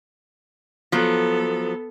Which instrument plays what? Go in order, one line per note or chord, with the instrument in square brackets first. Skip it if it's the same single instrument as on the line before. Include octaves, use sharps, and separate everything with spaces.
[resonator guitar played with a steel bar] F3 F#3 [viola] B3 A4